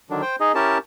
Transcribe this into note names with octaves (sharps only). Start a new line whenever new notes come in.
D3 D#3 F#3 D4
C5 G5
D#4 G#4 D#5
C#4 E4 G4 A#4 A5